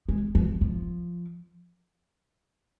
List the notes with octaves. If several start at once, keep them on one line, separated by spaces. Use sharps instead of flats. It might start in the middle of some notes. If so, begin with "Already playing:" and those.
G#3
F3
F3